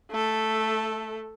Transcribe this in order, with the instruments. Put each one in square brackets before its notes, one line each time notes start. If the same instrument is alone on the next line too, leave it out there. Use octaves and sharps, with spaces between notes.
[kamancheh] A3 A4